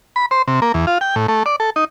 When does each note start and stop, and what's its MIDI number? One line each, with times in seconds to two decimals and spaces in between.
0.16 0.26 83
0.31 0.42 72
0.47 0.60 48
0.62 0.72 58
0.74 0.86 40
0.87 0.98 65
1.01 1.15 79
1.16 1.27 45
1.28 1.43 57
1.46 1.56 74
1.60 1.70 69
1.76 1.85 63